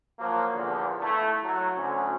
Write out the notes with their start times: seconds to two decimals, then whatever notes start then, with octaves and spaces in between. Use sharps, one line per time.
0.19 F3 F#3 A#3
0.54 E2 A#2 D3 F3
1.01 A3 E4
1.44 F#3
1.77 D2 C#4